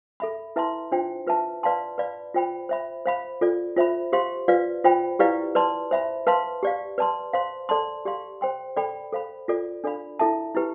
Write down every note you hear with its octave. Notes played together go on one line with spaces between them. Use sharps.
A4 E5 B5
E4 B4 E5 A5 C6
D4 F4 C5 G5
F4 B4 E5 A5
B4 D5 F5 A5 C6
B4 D5 F5 B5
F4 C5 G5 B5
C5 E5 B5
C5 F5 B5
F4 A4 D5
F4 C5 E5 B5
G4 C5 F5 C6
F4 B4 D5 F5
F4 C5 G5 B5
E4 G4 B4 D5 F5
B4 D5 A5 C6
C5 E5 B5
B4 F5 A5 C6
G4 D5 F5
B4 D5 A5 C6
C5 F5 C6
A4 D5 A5 C6
G4 D5 F5 C6
C5 G5 C6
A4 D5 G5 B5
A4 C5 F5 B5
F4 A4 D5
D4 A4 D5 F5 B5
E4 A4 E5 A5
E4 G4 B4